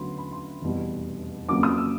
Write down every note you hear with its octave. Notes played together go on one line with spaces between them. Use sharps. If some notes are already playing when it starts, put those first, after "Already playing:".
Already playing: D2 C#3 F#3 B3 B5 C6
B5
C6
F1 E2 B2 G3
F2 C#3 F#3 A#3 D6
D#6
E6